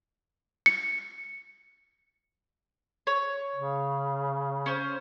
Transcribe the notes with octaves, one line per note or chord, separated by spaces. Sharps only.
C#7
C#5
C#3
C#4 C5